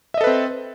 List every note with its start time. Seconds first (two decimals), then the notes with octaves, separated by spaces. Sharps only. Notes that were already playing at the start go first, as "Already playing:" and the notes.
0.14 E5
0.17 D#5
0.21 A4
0.24 B4
0.27 C4